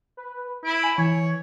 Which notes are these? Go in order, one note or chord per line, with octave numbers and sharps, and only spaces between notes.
B4
E4 D7
G#5
E3 C#5